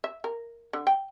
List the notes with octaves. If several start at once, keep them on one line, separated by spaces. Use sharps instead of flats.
E5
A#4
D3
G5